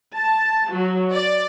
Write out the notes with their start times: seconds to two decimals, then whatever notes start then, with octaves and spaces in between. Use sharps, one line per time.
0.15 A5
0.72 F#3
1.13 D5